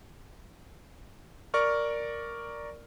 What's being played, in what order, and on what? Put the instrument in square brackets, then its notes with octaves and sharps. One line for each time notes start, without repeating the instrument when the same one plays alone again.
[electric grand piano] A#4 D5 C#6 F6